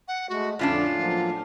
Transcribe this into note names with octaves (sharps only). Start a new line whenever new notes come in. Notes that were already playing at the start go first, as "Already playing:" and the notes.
F#5
G#3 A3 F#4
F2 A2 D3 C#4 D4 F4 D5
F3 F#3 A#3